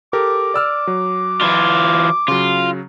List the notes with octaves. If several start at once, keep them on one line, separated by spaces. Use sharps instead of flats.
G4 A4 A#4 D6
D5 E6 F6
F#3
E3 F4
C#3 F#3 F4